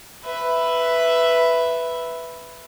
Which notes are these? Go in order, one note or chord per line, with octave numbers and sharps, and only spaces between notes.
B4 E5